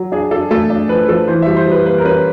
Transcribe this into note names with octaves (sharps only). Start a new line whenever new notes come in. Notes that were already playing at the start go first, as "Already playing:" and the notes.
Already playing: F#3
D4 G#4
D4 A4
A3 A4
D4
F3 B4
F3 A4
E3 C5
G3 E5
C5
G3
B4
A#3 B4
A#4
C#4 B4